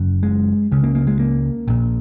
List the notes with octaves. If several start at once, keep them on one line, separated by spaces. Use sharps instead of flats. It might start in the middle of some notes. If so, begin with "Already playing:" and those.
Already playing: F#1 F#2
G#3
C#2 C#3 C#4
A#3
A#3
G#3
A#3
A#1 A#2